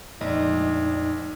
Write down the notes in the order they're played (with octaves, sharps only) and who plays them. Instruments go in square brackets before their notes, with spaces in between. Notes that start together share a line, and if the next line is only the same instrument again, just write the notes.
[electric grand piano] A#1 [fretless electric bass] F2 G#3 A3 [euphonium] D#4 [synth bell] D5 D#5